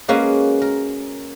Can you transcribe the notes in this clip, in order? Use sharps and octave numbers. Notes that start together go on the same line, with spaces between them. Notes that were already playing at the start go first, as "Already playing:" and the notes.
G#3 A#3 C#4 F#4 B4
A#4